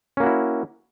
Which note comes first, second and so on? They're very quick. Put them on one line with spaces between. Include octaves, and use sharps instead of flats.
C#4 A#3 F#4 E4